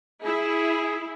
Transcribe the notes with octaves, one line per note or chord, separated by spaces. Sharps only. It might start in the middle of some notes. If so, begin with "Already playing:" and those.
E4 G#4